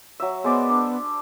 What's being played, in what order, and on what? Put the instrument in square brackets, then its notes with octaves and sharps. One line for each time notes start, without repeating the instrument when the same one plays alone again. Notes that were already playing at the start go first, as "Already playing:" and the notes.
[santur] F#3 E5
[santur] G#3 C5 D5 [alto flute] B3
[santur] D4